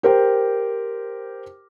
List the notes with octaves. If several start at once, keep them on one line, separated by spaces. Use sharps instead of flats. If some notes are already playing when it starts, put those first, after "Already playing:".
G4 A#4 C5 G5